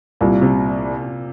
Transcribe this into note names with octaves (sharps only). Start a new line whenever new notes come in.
C2 A#2
C3